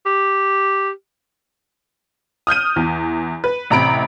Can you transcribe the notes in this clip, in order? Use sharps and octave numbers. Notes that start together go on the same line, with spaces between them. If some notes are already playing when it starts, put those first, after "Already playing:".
G4
D#6 F6 G6 D#7
E2
B4
A1 C3 A#5 B5 D7